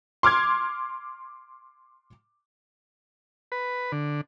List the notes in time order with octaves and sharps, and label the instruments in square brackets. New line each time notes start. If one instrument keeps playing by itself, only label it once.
[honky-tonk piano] C6 D6 F6 G#6
[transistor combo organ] B4
D3